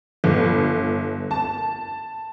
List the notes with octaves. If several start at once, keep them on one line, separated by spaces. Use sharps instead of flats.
G1
A5